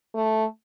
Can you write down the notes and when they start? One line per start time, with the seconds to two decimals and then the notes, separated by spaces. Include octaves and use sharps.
0.15 A3